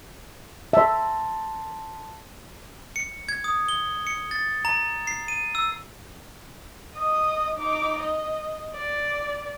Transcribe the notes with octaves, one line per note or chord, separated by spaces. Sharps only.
E5 A5 A#5 C6
C#7
G#6
D#6
G7
C#7
A6
A#5
C7
D#7
E6
D#5 D#6
D#4 D6
D#5
D5